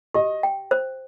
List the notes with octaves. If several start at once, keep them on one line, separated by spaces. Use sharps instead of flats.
G4 D#5
G5
C5